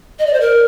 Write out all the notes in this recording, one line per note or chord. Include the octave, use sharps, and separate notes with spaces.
D#5
D5
C5
A#4